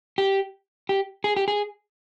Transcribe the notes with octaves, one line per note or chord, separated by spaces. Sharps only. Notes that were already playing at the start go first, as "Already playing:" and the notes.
G4
G4
G#4
G4
G#4